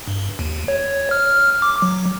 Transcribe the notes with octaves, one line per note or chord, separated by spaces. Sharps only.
G2
D#2
C#5
F6
D6
F#3